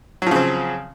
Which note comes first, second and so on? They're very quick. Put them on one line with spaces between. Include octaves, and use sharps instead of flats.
F#3 F3 C#3 C4